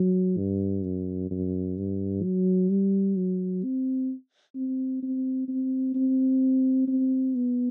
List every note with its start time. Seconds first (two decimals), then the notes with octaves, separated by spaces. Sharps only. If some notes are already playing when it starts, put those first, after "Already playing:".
Already playing: F#3
0.38 G2
0.84 F#2
1.31 F#2
1.77 G2
2.23 F#3
2.70 G3
3.16 F#3
3.63 C4
4.55 C4
5.03 C4
5.48 C4
5.95 C4
6.88 C4
7.35 B3